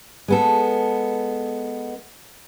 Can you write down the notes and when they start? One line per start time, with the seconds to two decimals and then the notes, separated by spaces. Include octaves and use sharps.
0.28 G#3 B3 A4